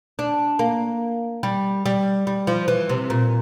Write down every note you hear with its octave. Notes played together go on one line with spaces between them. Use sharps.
D4
A#3
G3
G3
G3
F3
E3
C3
A#2